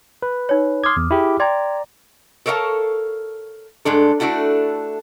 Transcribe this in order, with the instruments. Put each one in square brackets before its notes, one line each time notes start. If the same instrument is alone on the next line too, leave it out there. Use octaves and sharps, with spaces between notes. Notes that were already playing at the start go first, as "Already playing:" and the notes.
[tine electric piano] B4
[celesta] D#4 C#5
[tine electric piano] C6 G#6 [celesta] D6 D#6 F6
[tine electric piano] E2
E4 G4 G#4
[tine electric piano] D5 A#5 [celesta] G5 C6 G#6
[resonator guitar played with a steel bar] A4 A#4 C#5 D#5 F5 A5
G2 G#3 D4 A4
A3 D4 E4 F#4 A4